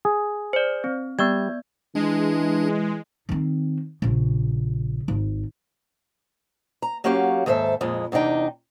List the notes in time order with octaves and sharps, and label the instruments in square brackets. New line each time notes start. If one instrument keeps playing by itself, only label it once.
[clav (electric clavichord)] G#4
[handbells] C5 D5
C4
[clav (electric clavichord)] G3 [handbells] B3 D5 G#6
[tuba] E3 [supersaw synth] G#3 [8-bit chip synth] D4
[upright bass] D#3 C4
A#1 C#3
G#1
[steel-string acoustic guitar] A#5
F#3 A#3 C#4 F#4 G4 F5
D#2 G#2 A4 C5 E5
F2 A#2 G#3
E2 C3 D4 D#4 G5